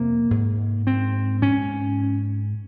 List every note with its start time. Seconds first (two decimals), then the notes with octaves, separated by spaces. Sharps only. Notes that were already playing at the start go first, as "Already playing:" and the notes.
Already playing: F2 C3 A#3
0.31 G#2
0.87 C4
1.42 G#2 C#4